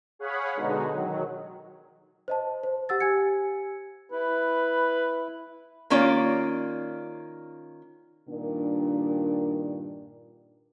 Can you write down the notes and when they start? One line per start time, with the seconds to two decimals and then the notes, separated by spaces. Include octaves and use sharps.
0.19 G#4 C#5 F5 F#5 G#5 B5
0.55 B2 D3 G#3 D#4 F#4
0.91 D#3 F#3
2.28 C5 D#5 A5
2.63 C5
2.89 G4 F#5 E6 A6
3.00 G4 G#5 G#6 C#7
4.12 E4 B4
5.90 D#3 A#3 C#4 F4 D5
8.29 G2 A#2 D#3 D4 A#4